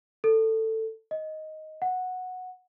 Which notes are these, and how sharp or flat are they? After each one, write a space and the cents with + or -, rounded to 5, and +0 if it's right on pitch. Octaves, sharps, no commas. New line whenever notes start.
A4 +15
D#5 +5
F#5 -10